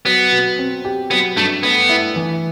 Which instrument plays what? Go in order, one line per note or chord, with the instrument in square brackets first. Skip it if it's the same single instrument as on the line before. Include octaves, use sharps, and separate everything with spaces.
[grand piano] F#3 [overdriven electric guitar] B3
[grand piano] B2
C4
G4
[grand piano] F#3 [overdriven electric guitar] B3
[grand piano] G2 [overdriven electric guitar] A3
[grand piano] A3 [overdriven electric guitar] B3
[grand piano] E4
E3